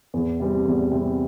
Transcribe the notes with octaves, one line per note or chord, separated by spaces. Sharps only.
E2
C3 G3 C4
E2
C3 G3 C4